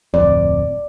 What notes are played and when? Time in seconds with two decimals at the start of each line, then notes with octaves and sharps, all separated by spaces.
0.14 D1 F2 D5